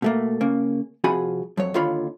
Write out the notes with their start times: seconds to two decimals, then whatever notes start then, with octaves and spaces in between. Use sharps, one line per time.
0.02 B2 A3 A#3
0.41 C#3 A#3
1.04 C3 F3 F#4 G#4 G#5 B5
1.57 F2 F#3 C#5
1.74 D#2 D3 D#3 F4 C#5 B5